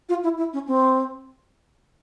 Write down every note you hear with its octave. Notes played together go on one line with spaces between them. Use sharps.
F4
E4
E4
C#4
C4